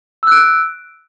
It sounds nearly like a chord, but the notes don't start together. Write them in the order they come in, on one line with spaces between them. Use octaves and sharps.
E6 F#6 D7